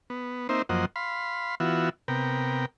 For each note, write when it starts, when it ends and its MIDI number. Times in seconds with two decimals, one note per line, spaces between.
0.10 0.47 59
0.49 0.62 58
0.49 0.62 60
0.49 0.62 63
0.49 0.62 72
0.49 0.62 76
0.69 0.85 42
0.69 0.85 53
0.69 0.85 58
0.69 0.85 72
0.69 0.85 75
0.69 0.85 78
0.96 1.55 77
0.96 1.55 83
0.96 1.55 84
1.60 1.89 52
1.60 1.89 59
1.60 1.89 65
1.60 1.89 66
1.60 1.89 76
2.08 2.65 48
2.08 2.65 59
2.08 2.65 70
2.08 2.65 79